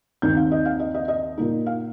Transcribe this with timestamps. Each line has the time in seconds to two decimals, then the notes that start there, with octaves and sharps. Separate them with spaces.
0.22 D#2 D#3 C4 D#4 G6
0.36 F5
0.51 D#5
0.65 F5
0.79 D#5
0.94 D#5
1.08 D#5
1.37 A#2 A#3 D#4
1.66 F5